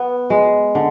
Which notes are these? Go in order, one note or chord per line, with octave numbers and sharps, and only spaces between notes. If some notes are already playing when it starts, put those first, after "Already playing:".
Already playing: B3
G#3
D3